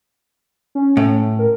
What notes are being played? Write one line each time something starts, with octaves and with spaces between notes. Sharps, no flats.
C#4
A2
A#4